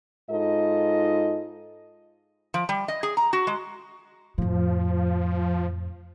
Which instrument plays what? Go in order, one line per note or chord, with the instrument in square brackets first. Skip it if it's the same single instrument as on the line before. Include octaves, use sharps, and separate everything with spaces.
[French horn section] G#2 D#4 F4 A4 D#5
[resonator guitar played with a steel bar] F3
G3
D#5
G#4
A#5
F#4
G#3
[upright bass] F2 A2 [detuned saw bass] F3